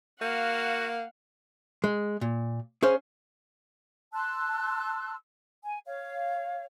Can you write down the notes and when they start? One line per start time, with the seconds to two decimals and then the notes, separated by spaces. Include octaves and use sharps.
0.21 A#3 F#4 F5 F#5
1.84 G#3
2.21 A#2
2.83 C#4 G#4 C5 F5
4.13 A5 C6 E6 F#6
5.64 G#5
5.85 C#5 F5